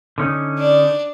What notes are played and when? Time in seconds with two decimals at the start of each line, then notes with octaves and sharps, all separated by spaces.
0.18 D3 C#4 D#4
0.59 D4 D5